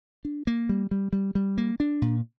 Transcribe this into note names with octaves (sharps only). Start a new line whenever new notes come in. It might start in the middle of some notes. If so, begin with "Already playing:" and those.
D4
A#3
G3
G3
G3
G3
A#3
D4
A#2